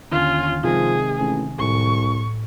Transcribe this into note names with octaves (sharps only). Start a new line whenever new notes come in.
D#2 D3 C#4 F4
C3 D#3 F3 G#3 G#4
A1 G#5
C2 A2 C#6